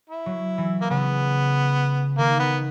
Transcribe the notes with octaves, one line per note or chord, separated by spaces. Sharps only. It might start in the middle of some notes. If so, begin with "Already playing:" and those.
E4
F#3
E3
A#3
C#3 B3
D#3 A#3
B3